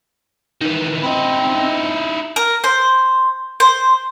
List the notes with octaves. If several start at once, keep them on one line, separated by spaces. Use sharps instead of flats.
D#3 E3
C4 D#4 E4
A#4
C5
C5